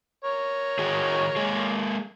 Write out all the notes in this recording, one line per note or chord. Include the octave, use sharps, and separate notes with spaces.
A#4 C#5
D#3 F#4 G#4
G#3 A#3 G#4